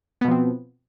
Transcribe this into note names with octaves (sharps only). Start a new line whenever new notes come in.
B2 F3 B3 C4